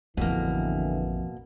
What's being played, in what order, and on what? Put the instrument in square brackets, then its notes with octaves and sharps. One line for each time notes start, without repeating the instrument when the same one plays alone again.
[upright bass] A1 B3 [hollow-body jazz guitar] F2 [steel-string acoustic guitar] B2 A#3 [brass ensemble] D3 E3